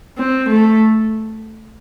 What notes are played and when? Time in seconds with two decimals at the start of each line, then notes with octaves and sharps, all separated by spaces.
0.18 C4
0.49 A3